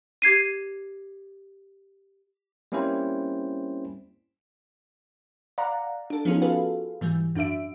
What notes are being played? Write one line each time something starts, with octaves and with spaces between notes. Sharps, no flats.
G4 G#6 C7 D#7
G3 A#3 C4 C#4 E4 C5
D5 F5 F#5 A#5
D4 A4
F3 B3 C#4 D#4 F4 G#4
F4 F#4 G#4 A4 B4 F5
G#2 E3 G3
F#2 D4 F#4 E5 D7